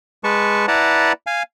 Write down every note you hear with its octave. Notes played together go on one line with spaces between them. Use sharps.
G#3 B4 A5 C#6
E4 B4 D5 F#5 A5 A#5
F5 G#5